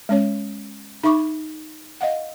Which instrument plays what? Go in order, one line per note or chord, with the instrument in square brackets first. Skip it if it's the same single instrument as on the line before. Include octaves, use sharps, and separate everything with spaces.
[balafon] G#3 C#4 C#5
D#4 E5 B5 C#6 D6
D#5 F5 F#5